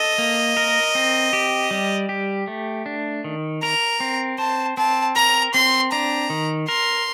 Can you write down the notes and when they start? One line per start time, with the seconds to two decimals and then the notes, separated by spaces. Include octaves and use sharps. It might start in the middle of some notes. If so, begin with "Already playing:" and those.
Already playing: A4 D#5
0.18 A#3
0.57 A#4
0.95 C4
1.33 G4
1.71 G3
2.09 G4
2.48 A3
2.86 D4
3.24 D#3
3.62 A#4 A#5
4.00 C4
4.38 C5 A5
4.77 C4 A5
5.16 A#4 A#5
5.54 C4 C6
5.92 D4 A#5
6.30 D#3
6.68 A#4 C6